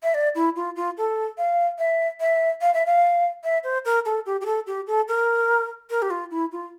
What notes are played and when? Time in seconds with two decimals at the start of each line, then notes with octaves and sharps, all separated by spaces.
0.03 E5
0.14 D5
0.35 E4
0.56 F4
0.76 F4
0.97 A4
1.38 F5
1.79 E5
2.20 E5
2.61 F5
2.74 E5
2.86 F5
3.44 E5
3.64 C5
3.85 A#4
4.05 A4
4.26 G4
4.41 G4
4.46 A4
4.67 G4
4.87 A4
5.08 A#4
5.90 A#4
6.02 G4
6.10 F4
6.31 E4
6.52 F4